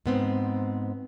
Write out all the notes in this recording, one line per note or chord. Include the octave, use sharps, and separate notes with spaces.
G#2 B3 C4